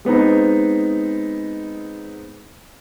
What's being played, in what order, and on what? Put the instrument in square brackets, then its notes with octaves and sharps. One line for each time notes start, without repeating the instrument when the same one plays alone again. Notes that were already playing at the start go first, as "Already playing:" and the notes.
[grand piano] G#3 B3 C4 D#4